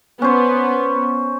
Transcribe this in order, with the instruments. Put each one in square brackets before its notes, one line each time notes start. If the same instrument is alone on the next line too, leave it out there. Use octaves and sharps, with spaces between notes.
[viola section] B3 [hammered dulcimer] C#4 C5